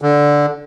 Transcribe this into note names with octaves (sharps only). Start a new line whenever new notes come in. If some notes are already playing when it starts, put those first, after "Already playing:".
D3